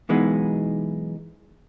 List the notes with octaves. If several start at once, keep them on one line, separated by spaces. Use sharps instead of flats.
B1 E3 G#3 B3 D#4